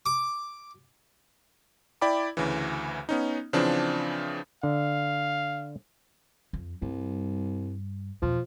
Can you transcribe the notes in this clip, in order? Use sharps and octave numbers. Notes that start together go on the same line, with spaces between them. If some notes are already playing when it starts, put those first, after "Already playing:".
D6
E4 D5 G5 B5 D6
D2 C#3 E3
B3 C#4 D#4
C#3 E3 F3 C4 D4
D3 F5
F2
C2 G2
E2 B2 F3